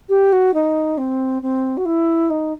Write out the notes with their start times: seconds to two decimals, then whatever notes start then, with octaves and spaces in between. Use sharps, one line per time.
0.09 G4
0.32 F#4
0.53 D#4
0.97 C4
1.42 C4
1.77 F#4
1.85 E4
2.30 D#4